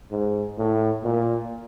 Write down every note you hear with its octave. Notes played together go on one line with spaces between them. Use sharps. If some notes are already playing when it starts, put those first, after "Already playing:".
G#2
A2
A#2